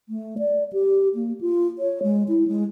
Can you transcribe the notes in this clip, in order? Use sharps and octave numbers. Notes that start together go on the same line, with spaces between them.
A3
D5
G4
A#3
F4
C#5
G#3
E4
G#3